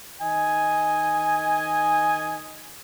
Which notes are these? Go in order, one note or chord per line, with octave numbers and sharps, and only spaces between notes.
D#3 D#5 G#5